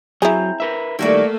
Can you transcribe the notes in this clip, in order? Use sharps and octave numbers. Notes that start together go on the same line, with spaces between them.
F#3 C4 E4 G#4 A#5
A#4 B4 E5
D#3 G3 A3 A#3 E4 F#4 D5